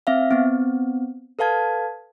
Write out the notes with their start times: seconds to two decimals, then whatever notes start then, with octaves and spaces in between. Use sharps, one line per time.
0.07 C4 E5 F5
0.31 B3 C4
1.39 A4 B4 F5 A5 G#6